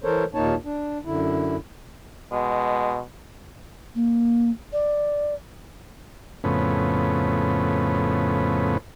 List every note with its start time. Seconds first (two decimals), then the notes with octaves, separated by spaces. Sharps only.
0.04 E3 A4 A#4 C5 C#5
0.34 D#2 A#2 A#3 D#4 C#5 A5
0.65 D4
1.05 F#2 D3 E4
2.32 B2 G#3
3.95 A#3
4.73 D5
6.44 F2 A2 C#3 B3